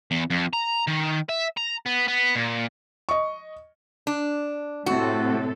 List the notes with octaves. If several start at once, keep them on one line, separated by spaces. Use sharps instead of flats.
E2
F2
A#5
D#3
E5
A#5
B3
B3
A#2
D#5 C#6
D4
A2 C3 F#4 A4